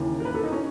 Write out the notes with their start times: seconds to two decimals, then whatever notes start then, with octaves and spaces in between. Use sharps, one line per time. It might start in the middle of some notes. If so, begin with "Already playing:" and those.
Already playing: D#2 C#3 E3
0.20 A#4
0.25 B4
0.35 A4
0.44 D#4
0.52 C#4